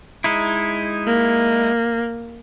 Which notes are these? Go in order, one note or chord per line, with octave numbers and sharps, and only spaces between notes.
G#3 D#4 E4
A#3